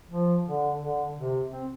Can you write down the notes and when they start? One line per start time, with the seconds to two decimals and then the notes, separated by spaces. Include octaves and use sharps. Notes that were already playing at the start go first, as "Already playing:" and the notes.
0.09 F3
0.45 D3
0.80 D3
1.16 C3
1.52 C4